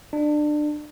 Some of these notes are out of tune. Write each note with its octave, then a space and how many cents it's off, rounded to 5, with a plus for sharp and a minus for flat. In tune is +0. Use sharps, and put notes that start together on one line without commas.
D4 +25